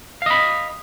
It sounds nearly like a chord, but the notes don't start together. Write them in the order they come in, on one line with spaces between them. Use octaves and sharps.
F5 D#5 B5